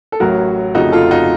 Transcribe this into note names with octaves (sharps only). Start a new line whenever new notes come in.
A4
A1 A2 F#3 F#4 A#4
F1 F2 C#3 F3 A3 D#4 F#4
F4 A4
D#4 F#4